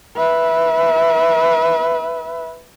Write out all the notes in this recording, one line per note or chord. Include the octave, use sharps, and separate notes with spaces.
B4 E5